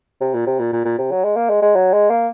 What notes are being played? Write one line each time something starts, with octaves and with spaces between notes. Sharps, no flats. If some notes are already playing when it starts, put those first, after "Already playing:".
C3
A#2
C3
A#2
A#2
A#2
C3
F#3
G#3
A#3
G#3
G#3
F#3
G#3
A#3